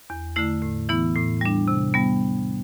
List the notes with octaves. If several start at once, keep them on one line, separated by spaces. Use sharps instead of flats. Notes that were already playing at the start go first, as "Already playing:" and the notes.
E2
D3 A3 E4
A2
E3 B3 E4
A2
G3 D4
C3
G3 B3